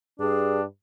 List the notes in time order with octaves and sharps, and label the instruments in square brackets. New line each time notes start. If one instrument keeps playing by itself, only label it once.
[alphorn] G2 [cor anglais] D4 [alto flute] G#4